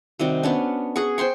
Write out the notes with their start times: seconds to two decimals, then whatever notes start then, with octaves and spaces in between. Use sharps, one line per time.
0.19 C3 D#3 G3 F#4
0.43 B3 C#4 D4
0.96 G#4 F#5 C#6
1.18 C5 G5 C6 C#6